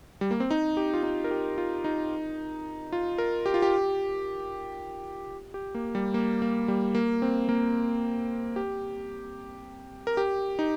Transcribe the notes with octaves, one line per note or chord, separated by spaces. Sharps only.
G3
A#3
C4
D#4
G4
F4
D#4
A#4
G4
F4
D#4
F4
A#4
G4
F4
G4
G4
A#3
G3
A#3
A#3
G3
A#3
C4
A#3
G4
A#4
G4
D#4